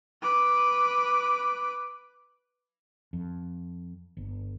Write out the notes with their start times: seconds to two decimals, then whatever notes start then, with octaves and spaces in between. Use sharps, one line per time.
0.22 B4 D6
3.13 F2
4.17 G1